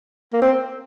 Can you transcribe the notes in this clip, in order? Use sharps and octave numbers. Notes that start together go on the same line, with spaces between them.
A#3
C4